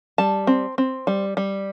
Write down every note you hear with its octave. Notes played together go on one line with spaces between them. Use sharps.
G3 A5
C4
C4
G3
G3